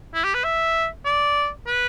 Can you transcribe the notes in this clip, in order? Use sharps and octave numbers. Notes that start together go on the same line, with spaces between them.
E4
G4
B4
E5
D5
B4